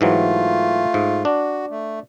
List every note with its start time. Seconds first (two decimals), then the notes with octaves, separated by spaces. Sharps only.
0.01 G#2 E3 F#3 A3 F4
0.94 G#2
1.25 D4 F#4
1.71 A3